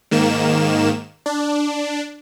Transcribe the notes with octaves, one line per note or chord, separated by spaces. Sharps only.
G#2 D#3 A#3 E7
D4